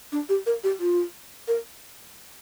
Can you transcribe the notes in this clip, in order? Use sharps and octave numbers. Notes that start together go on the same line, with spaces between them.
D4
G4
A#4
G4
F4
A#4